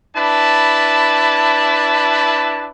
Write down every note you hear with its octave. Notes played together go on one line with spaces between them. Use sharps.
D4 E4 B4 A5